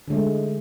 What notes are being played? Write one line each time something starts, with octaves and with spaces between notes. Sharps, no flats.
D3 G#3 A3